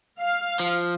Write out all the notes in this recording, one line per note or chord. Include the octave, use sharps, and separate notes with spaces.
F5
F3